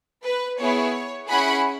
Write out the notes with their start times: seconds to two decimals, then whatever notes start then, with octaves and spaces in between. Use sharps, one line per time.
0.24 B4
0.59 B3 E4 G#4 C#5
1.28 C#4 E4 G#4 F#5 B5